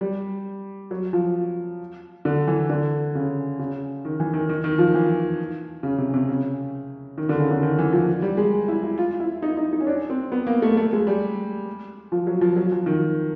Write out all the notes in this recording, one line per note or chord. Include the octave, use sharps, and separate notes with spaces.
G3
F#3
F3
D3
E3
D3
C#3
C#3
D#3
E3
D#3
D#3
D#3
F3
E3
C#3
C3
C3
C#3
D#3
D3
C#3
D3
D#3
E3
F3
G3
G#3
E4
E4
F4
E4
D#4
D#4
D#4
C#4
D4
C4
B3
A#3
A3
A3
G#3
G3
F3
F#3
F3
F#3
F3
D#3